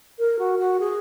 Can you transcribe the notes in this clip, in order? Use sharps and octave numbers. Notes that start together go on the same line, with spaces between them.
A#4
F#4
F#4
G#4